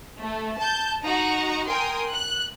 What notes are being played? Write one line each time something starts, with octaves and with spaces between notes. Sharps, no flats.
A3
A5 G6
D#4 F#4 F#5 A#5
A#4 G5 G#5 C6 D#6
F#6